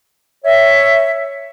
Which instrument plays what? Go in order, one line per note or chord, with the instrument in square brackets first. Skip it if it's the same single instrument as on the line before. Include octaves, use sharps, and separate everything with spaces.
[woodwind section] C#5 E5